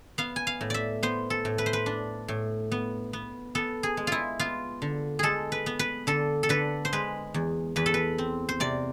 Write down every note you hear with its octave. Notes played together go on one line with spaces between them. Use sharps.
B3 F5
G#5
F5
A2
D5 E5
B3 C5
A4
A2
B4
C5
B4
D4
A2
B3
B3
B3 A4
G#4
G#3
E4 F4
B3 F4
D3
G#3 G#4 A4
B4
B3
B4
D3 A4
A4
D3 B4
C5
G#3 B4
E2
E2 B4
A4
B4
C4
C5
C3 D5